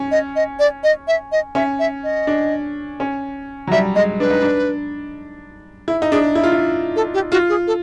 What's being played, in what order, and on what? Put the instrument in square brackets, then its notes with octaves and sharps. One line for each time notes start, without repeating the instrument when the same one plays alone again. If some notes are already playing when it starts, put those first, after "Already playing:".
Already playing: [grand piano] C#4
[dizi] D#5
D#5
D5
D#5
E5
D#5
[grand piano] C#4 [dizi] E5
[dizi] E5
D#5
[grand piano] D4
C#4
F#3
[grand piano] G3 [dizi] E5
[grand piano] G#3 [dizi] D#5
[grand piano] D4 [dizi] B4
[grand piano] D#4
D4
E4
D#4
[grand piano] D4 [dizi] G#4
[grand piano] E4
F4
E4
[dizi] A4
G4
[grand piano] F4 [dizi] F#4
[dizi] G#4
A4